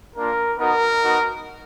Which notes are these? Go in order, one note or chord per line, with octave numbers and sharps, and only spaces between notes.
A#3 D4 F4 A#4
B3 D#4 F#4 A#4
B3 D#4 F#4